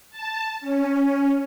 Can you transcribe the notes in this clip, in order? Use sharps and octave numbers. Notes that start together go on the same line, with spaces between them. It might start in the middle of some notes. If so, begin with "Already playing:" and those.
A5
C#4